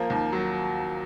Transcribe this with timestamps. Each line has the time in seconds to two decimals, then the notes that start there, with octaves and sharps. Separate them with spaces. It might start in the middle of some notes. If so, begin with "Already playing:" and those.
Already playing: F3 A#3
0.10 D#2
0.33 F#3